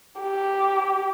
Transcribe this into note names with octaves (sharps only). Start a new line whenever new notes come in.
G4